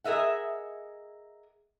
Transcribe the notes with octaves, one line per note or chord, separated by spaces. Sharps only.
G#4 A#4 D#5 E5 F#5